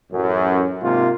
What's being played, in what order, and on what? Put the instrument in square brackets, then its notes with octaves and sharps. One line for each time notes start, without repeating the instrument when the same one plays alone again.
[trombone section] A1 F#2
G#2 C3 A#3 F4